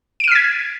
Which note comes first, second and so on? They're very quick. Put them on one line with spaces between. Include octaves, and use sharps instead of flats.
D7 D#7 F6 B6 G#6